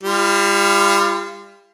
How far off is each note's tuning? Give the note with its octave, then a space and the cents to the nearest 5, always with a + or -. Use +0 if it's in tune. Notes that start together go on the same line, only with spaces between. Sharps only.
G3 +30 F4 -25